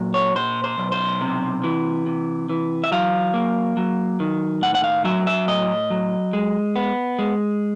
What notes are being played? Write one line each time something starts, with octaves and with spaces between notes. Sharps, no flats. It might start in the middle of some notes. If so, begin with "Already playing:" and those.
Already playing: A#2 F#3
C#5
A#2 C5
C5
B1
C5
C3
E3
C3
E3
E5
F#3 F5
A#3
F#3
D#3
A2 F#5
F#5
F5
F#3 E5
E5
A2 D#5
F#3
G#3
B3
G#3